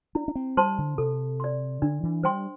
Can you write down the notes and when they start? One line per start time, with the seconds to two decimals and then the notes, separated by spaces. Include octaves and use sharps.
0.15 D4 E4
0.28 D4
0.35 C4
0.57 G3 C5 A5 C6
0.78 D3
0.98 C3 A4
1.40 D5 C6
1.82 D3 D4
2.03 E3
2.23 G3 C5 G5 C6